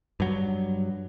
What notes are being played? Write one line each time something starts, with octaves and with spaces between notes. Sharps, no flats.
G2 F#3